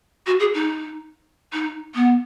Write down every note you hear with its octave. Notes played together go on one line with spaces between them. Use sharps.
F#4
G#4
D#4
D#4
B3